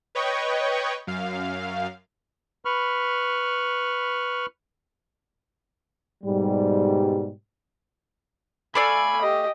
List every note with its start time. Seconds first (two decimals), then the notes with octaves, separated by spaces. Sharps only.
0.15 B4 C#5 D#5 G5 C#6
1.07 F#2 F5
2.65 B4 B5 C#6 F6
6.24 G#2 B2 G3
8.75 A3 D5 F5 G#5 B5
9.22 G4 D#5